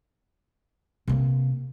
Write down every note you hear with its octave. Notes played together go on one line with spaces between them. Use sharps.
C3 A#3